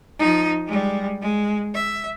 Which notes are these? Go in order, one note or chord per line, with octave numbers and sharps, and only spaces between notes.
F3 D#4
G3 G#3
G#3
E5